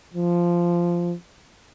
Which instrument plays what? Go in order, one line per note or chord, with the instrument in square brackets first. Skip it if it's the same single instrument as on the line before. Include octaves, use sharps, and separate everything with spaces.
[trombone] F3